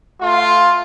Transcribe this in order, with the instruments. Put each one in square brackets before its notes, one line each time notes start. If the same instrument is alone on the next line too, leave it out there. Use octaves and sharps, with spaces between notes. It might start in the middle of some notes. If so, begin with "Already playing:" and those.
[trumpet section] A3 F4